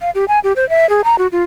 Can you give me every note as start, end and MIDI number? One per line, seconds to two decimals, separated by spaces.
0.01 0.10 77
0.15 0.25 67
0.28 0.39 80
0.44 0.53 67
0.56 0.68 72
0.69 0.88 76
0.89 1.02 68
1.04 1.18 82
1.18 1.27 66
1.32 1.44 65